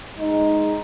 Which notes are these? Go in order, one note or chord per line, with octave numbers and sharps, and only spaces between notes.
G#3 D#4